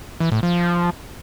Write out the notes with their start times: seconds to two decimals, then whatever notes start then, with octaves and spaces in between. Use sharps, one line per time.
0.20 E3
0.32 A2
0.43 F3